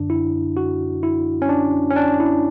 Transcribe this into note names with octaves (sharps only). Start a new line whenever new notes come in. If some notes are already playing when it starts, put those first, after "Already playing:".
Already playing: F#2 D3 D4
E4
F#4
E4
C#4
D4
C#4
D4
E4